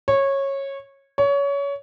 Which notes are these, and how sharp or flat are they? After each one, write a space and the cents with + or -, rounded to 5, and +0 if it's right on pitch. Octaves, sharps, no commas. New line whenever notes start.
C#5 -15
C#5 +25